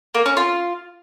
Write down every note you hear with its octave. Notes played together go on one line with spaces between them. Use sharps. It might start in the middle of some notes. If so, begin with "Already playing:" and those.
A#3
C#4
F4